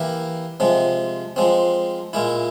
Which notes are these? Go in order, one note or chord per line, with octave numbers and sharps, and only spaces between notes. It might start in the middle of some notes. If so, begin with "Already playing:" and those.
Already playing: E3 A#3 E4 G4 A#4
C3 F3 G#3
F3 G#3 C4
A#2 G#3 E4